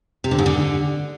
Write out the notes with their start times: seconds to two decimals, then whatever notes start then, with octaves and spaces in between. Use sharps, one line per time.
0.24 C3
0.31 D3
0.39 G#2
0.46 D3